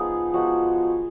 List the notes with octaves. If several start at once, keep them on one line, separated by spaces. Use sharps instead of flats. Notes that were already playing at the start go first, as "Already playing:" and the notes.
Already playing: F3 G#3 B3 D#4 G#4
F3 G#3 B3 D#4 F#4